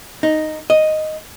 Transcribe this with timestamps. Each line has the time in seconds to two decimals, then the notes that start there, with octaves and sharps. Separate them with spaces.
0.23 D#4
0.70 D#5